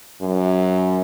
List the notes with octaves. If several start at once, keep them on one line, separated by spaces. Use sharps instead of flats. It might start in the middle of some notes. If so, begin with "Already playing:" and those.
F#2